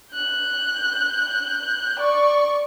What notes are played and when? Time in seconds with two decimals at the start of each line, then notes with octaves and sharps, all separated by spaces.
0.13 F#6 G6
2.00 D5 C#6